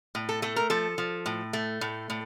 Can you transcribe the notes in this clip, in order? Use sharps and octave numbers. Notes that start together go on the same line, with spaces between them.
A2
A4
A3 A4
A#4
F3 A4
F3
A2
A3
A2
A2